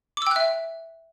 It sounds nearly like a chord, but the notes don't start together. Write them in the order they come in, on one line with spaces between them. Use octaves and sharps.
D6 E6 G5 F#6 E5